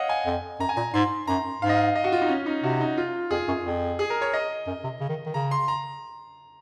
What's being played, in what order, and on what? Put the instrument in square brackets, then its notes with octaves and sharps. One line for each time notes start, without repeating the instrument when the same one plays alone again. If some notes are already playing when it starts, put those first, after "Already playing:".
Already playing: [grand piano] C#5 D#5 F5 F#5
G#5
[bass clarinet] F2
[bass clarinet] F#2 [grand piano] A#5
[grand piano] G#5
[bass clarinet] A#2 [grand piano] A#5
[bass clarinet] G#2 [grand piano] C6
[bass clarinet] F#2 [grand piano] A#5
[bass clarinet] G#2 [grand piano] F5
[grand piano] D#5
F5
D#5
F#4
F4
D#4
C#4
D#4
[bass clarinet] C3 [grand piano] F#4
[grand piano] D#4
F4
[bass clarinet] F2 [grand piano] G#4
[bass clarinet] F#2
F2
[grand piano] G#4
A#4
C#5
D#5
[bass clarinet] F#2
C3
C#3
D#3
D#3
[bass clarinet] C#3 [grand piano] A#5
[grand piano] C6
A#5